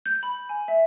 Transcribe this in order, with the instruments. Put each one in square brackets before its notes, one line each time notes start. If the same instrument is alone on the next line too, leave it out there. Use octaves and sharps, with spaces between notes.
[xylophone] G6
B5
G#5
E5